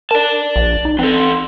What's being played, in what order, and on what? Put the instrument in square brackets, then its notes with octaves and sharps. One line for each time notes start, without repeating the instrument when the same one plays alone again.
[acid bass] A#4 [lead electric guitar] D5 A5
[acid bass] A#1
D#4
[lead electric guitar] E3 A4 [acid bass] C4